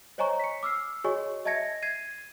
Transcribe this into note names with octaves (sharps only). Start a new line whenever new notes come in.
C5 C#5 D#5 G#5 A#5 C#6
B6 C#7
D6 E6 F6 C7
F#4 G#4 C#5 D#5 G#5 C#6
D#5 E5 A5 G#6 A#6 C#7
G#6 C7 D#7